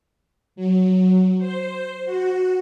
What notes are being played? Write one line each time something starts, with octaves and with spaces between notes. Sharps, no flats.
F#3
C5
F#4